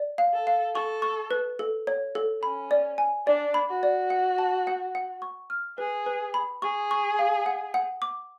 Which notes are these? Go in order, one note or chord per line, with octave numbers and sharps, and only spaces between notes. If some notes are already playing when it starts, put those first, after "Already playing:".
Already playing: D5
F5
A4
F5
A4 C#6
C#6
B4
A4
C#5
A4
C#4 B5
D5
G#5
D4 D5
B5
F#4
D5
F#5
A5
F#5
F#5
C#6
F6
G#4 B4
B4
B5
G#4 C#6
C#6
F5
F#5
F#5
D6